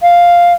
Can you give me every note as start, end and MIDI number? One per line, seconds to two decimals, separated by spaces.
0.02 0.53 77